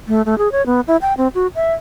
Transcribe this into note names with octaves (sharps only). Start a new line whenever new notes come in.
A3
A3
G#4
C#5
B3
E4
G5
C4
F#4
E5